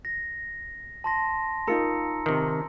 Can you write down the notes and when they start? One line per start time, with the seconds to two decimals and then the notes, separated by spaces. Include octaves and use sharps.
0.05 A#6
1.04 A5 C6 A#6
1.67 D#4 F4 A#4 A#5 E6 C#7
2.26 C3 D#3